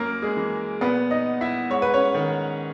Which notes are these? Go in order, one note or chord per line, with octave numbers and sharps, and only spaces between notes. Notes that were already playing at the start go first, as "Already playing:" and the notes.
Already playing: F#2 A#3 A#4
G#3 G#4
E3
A#2 B3 B4
D#4 D#5
E4 E5
G#2 C#5
B4
C#4 C#5
D#3